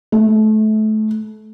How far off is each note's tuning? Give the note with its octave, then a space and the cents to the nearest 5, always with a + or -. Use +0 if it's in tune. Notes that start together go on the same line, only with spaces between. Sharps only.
A3 -25